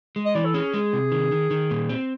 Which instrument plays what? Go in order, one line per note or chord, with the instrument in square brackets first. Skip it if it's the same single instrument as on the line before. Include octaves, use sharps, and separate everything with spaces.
[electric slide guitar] G#3
[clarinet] D#5
[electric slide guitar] E3 [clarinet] D5
[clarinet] A4
[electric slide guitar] C#4 [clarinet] G#4
[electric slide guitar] G#3
C3
D#3
D#3
D#3
A#2
C4